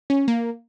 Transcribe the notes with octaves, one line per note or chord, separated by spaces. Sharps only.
C#4
A#3